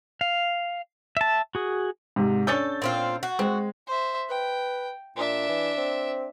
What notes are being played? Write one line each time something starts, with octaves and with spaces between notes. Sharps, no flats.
F5
E5 A5
F#4 G#4
G#2 C3
C#4 D4 A4 G6 A6
A#2 C4 F4
F#4
G#3 C4
C5 E5
B4 G5
A#2 D4 E5
E3
C4